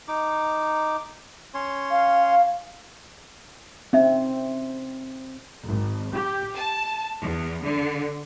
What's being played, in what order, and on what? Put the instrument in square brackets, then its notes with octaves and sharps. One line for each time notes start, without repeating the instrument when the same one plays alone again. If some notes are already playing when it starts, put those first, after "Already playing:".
[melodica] D#4 D6
C#4 C#5 C6
[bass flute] F5
[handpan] C4 [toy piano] C#4 D#4 E5
[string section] G#1
G4
A5
E2
D3